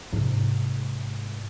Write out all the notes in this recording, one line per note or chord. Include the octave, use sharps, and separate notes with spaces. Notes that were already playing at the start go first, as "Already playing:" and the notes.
G#2 C3